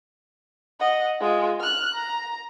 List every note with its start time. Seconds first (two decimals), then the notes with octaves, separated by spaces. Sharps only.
0.80 D#5 F#5
1.21 G#3 F4
1.61 F6 F#6
1.95 A#5